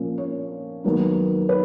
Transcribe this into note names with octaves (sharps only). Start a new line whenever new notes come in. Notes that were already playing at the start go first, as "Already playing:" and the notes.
Already playing: A#2 F3 A#3 C#4
C#5
D#2 D#3 F#3 B3
B4